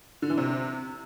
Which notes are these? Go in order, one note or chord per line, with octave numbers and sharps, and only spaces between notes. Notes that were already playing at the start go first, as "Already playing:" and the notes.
D3
E3
C3